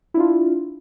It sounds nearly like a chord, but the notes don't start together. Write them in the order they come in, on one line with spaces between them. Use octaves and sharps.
E4 D4 F4